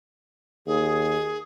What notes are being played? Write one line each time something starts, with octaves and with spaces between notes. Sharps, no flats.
D#2 G#4